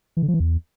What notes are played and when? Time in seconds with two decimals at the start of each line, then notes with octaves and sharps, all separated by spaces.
0.17 E3
0.22 D3
0.28 F3
0.34 E3
0.40 E2